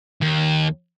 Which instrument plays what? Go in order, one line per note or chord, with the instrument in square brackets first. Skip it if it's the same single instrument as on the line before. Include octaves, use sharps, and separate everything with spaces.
[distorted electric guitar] D#2